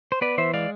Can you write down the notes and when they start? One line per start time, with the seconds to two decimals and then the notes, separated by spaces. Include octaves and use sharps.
0.12 C5
0.21 B3 B4 D5
0.38 E3 C5 E5
0.54 G#3 D5 F5